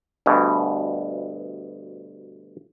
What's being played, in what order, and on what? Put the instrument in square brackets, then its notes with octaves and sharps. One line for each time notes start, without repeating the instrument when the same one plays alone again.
[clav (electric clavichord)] D2 G2 B2